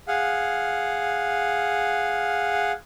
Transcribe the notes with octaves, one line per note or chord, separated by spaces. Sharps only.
G#4 F5 F#5